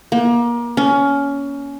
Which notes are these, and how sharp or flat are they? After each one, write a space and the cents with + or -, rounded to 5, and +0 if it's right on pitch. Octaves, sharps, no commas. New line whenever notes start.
A#3 +30
C#4 +20